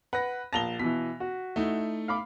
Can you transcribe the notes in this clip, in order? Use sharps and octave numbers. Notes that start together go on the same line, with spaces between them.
B4 F#5 A#6
A#1 A5 A#6 F7 G7
B2 E3 B6
F#4
A3 D#4 E4
F5 B5 D6